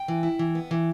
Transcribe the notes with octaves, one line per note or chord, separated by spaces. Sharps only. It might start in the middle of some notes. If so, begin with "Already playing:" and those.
Already playing: G5
E3
E4
E3
B3
E3